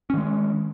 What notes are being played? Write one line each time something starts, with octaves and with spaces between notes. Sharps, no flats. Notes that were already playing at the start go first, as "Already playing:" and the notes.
D#3 G#3 C#4